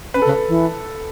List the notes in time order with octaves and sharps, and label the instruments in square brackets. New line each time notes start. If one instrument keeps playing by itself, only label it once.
[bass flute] C#4 [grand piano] B4
[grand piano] A4
[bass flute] C#3
[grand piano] B4
[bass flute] E3